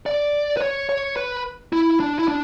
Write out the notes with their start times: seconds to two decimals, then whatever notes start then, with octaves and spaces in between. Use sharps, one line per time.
0.06 D5
0.57 B4
0.62 C#5
0.89 C#5
1.17 B4
1.73 E4
2.00 D4
2.19 E4
2.28 D4